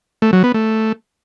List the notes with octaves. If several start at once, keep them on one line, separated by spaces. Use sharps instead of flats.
A3
F#3
B3
A3